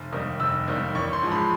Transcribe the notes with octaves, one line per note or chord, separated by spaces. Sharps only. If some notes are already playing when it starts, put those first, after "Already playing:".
Already playing: F1
D#2 D#3 G3
F1 E6
D#2 D#3 G3
A1 C#6
C6
G#2 F3 G#3
B5